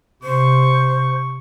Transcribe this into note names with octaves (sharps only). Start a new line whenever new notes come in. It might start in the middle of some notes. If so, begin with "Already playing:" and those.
C3 C5 C#6